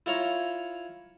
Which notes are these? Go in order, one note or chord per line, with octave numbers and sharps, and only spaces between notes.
E4 F4 C#5 A#5